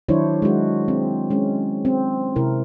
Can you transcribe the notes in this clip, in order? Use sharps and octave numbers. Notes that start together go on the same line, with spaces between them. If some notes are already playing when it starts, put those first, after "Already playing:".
D#3 F#3 D4 E4 C5 C#5
G#3 D4 F#4
C4
G#3 C#4
C4
C3 E4 A#4